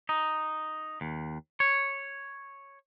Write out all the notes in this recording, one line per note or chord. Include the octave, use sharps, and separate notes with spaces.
D#4
D#2
C#5